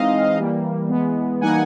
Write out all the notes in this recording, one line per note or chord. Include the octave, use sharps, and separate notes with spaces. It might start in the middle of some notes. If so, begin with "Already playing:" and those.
Already playing: E3 G#3 C4 D#4 D#5 F5
E3 G3 A#3
E3 G#3 B3
E3 G3 A#3 D#4 F#5 G#5